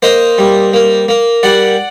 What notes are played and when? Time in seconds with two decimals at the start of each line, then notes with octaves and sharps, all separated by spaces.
0.02 A#3 C5 D#5
0.38 G3
0.73 A#3
1.08 A#3
1.43 G3 D5 F#5